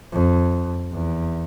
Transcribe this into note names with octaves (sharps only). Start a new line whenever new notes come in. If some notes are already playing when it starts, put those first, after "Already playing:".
F2
E2